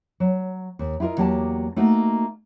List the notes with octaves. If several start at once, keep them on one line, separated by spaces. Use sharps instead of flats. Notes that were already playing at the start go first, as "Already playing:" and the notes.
F#3
D#2
E4 F4 G4 A#4 D#5
E2 F#3 A#3 G4 G#5 A5
A3 A#3 D#4 F#4